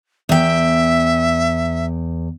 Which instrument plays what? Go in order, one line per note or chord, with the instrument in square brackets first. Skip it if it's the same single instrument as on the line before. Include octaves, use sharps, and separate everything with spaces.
[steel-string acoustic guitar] E2 G5 [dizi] E5